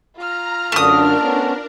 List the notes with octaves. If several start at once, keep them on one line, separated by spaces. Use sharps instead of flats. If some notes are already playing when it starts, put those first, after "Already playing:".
F4 A#5 F6
F#2 D3 A3 D4 A#4 D#6
B3 C#4